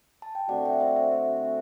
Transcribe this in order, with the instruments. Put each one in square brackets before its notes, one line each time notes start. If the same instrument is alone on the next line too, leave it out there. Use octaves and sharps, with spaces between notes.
[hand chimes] A5
G5
[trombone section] D3 A3 C4 F#4 [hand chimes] D5 F#5
[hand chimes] E5 G5
D5
C5 E5
C5 E5
C5 E5